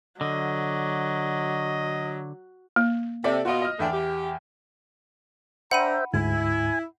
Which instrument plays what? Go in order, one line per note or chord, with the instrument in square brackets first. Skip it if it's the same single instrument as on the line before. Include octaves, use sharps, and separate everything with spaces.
[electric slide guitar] D3 [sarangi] F#3 [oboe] D#5
[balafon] A#3
[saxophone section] C3 [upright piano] A4 D5 E5
[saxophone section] B2 F4 [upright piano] F#4 D#5
[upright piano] D#5 F6
[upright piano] E2 E5 G5 [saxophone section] A3 D4
[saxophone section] G4
[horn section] D4 A#5 [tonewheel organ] C5 E5 G5 [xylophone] F#5 B5 D#7
[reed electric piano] D2 G#2 [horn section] E4 [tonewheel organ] G#5